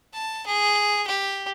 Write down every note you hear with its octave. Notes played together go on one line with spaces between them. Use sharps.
A5
G#4
G4